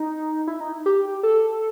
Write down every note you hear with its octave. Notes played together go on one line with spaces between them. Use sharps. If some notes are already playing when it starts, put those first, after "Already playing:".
Already playing: D#4
E4
D#4
G4
A4